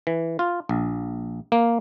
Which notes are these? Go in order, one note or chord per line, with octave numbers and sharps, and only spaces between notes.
E3
F4
A#1
A#3